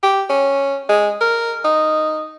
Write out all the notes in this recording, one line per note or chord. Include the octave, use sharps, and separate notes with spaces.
G4
C#4
G#3
A#4
D#4